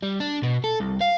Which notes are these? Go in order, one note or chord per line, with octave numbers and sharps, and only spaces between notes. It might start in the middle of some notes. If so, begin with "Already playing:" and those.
G3
D4
B2
A4
C2
F5